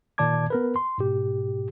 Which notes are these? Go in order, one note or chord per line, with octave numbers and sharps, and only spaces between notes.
A#2 D#3 D5 A5 D6 G#6
B3 A#4 B4
C6
G#2 B2 G4